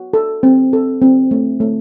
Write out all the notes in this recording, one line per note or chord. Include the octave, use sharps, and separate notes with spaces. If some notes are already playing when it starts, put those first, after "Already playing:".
Already playing: F#4
A4
C4
A4
C4
A3
A3